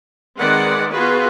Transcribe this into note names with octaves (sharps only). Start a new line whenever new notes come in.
D#3 G#3 C4 B4 D5 F#5
B3 F4 F#4 G#4 B4